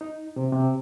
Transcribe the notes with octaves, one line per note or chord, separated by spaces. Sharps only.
D#4
C3
C3